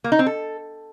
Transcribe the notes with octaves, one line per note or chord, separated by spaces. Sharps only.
A#3
D#4
C4
A4